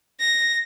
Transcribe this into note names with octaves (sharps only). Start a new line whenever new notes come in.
A#6